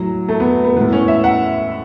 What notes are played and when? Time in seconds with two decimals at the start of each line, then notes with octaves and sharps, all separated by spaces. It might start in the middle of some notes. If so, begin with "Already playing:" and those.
Already playing: A2 F#3
0.29 A3
0.40 B3
0.64 B3
0.76 A2 E3 B3
0.92 C#4
1.08 E5
1.24 F#5